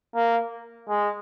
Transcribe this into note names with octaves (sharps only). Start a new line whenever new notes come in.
A#3
G#3